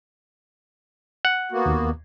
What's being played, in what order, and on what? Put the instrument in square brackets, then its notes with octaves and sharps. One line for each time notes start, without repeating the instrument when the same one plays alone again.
[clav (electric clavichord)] F#5
[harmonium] A#3 B3 F#4
[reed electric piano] D#2